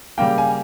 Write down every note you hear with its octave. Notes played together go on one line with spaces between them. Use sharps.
C#3 G3 A#3 G5
G#5